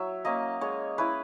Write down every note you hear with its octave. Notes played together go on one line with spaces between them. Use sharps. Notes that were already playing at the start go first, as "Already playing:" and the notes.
Already playing: F#3 C#5 E5
A#3 C#4 D#5
G#3 C#5
C#4 E4 B4